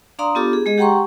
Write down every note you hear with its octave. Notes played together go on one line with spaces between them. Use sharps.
D4 D5 F5 A#5 C6 D#6
B3 D4 F4 G4 A4 D6
G#4
G#3 G#4 D#5
G4 F#5 G5 A#5 C6 C#6